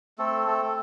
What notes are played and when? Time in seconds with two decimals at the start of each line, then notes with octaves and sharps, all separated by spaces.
0.18 A3 C4 A4
0.47 A3 A4
0.61 A3